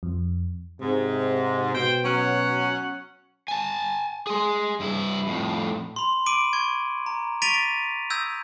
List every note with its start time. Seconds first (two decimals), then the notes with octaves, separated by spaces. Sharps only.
0.03 F2
0.80 G#2 C3
1.73 B2 C5 G5
2.04 F#3 C#4 F#5
3.48 G#5 A5
4.27 G#4 C6
4.80 G2 E4
5.27 F2 A2
5.96 B5 C6
6.26 B5 D6 D7 D#7 F#7
6.53 C#6 G#6
7.06 A#5
7.42 C#6 A6 B6 D7 D#7 F7
8.10 D#6 E6 G6 G#6 A#6